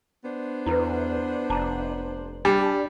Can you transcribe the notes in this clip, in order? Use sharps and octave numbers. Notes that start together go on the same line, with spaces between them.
B3 D4 C5
E2 E4 A4 B4
F1 A5 A#5 D6
G3 D4